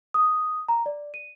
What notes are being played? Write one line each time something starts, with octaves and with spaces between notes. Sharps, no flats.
D#6
A#5
D5
D#7